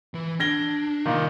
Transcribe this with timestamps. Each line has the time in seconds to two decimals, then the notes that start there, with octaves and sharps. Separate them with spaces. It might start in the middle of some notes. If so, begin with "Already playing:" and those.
0.14 E3 B4
0.40 D4 G#6 A#6 G7
1.06 C2 A#2 D#3 D#5